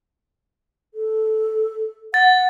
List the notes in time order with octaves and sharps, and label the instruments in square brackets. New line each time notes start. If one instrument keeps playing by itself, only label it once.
[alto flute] A4
[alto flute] F#5 [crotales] A6